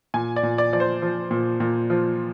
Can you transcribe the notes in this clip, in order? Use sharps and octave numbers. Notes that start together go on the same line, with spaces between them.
A#2 G#5
D5
A#2
D5
F3 D5
C5
F3
A#2
A#2
F3